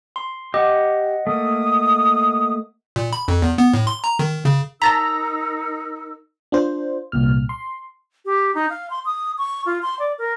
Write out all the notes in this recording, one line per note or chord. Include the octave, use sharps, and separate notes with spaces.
C6
G4 D#5 F#5 D6
A3 A#3 D#6
A#2
B5
F2
E2
B3
A2
C6
A#5
D#3
C#3
D#4 A#4 A5 A#5 E6 A6 B6
D4 F4 C5
C2 A#2 F6
C6
G4
D#4
F5
C6
D#6
C#6
F4
C6
D5
A#4